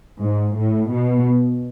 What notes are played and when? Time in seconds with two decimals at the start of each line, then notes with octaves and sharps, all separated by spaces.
0.19 G#2
0.56 A2
0.91 B2